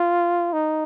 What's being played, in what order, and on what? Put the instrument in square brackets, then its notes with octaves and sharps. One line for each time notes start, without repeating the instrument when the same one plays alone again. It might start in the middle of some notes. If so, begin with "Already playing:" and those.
Already playing: [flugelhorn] F4
D#4